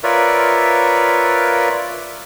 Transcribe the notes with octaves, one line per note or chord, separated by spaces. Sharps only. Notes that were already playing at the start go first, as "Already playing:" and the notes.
F4 A#4 B4 C#5 D5 E5